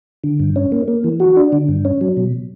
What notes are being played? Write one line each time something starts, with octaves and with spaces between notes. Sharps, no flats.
D3
G2
C#4
A#3
A#3
E3
F#4
D4
D3
G2
C#4
F#3
B2